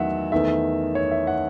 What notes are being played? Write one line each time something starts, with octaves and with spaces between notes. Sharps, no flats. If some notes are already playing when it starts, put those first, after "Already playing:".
Already playing: E2 D#3 F#3 A3 E5 F#5
E2 D#3 A3 E5
C#5
E5
F#5